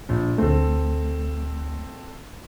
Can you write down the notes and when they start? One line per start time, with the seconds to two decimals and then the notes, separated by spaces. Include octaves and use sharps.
0.09 A#1
0.38 D2 A3 C4 A4